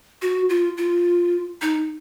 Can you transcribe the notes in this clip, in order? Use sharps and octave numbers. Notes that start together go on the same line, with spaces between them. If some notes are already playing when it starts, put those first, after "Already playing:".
F#4
F4
F4
D#4